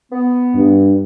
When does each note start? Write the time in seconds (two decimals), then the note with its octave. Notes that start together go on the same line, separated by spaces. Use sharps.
0.12 B3
0.55 G2